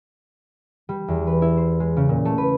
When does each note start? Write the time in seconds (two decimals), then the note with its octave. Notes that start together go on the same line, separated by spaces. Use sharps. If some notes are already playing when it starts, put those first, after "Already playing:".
0.89 G3
1.08 E2
1.27 B4
1.42 E4
1.57 C5
1.80 G#3
1.97 C#3
2.09 A#2
2.25 A3
2.38 B4